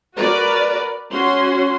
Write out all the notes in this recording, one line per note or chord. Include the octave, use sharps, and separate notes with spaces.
F#4 A#4 B4 D5
C#4 F#4 C6